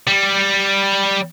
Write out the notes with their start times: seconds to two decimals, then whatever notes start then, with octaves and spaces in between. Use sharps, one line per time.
0.07 G3